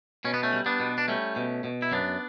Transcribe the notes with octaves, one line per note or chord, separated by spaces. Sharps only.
B2 C#4
B3
A3 C#4
G3
B3 D4
B2
D4
G3 A3 C#4
B2
B2
E4
F#2 B3 D4